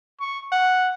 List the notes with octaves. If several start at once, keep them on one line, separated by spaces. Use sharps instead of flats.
C#6
F#5